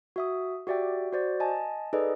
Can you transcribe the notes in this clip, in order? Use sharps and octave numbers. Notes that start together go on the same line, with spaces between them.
F#4 E5 D#6
F#4 G4 D5 E5 G5
F#4 C5 D5
D#5 G#5 A5
D#4 G#4 A4 B4 D5 D#5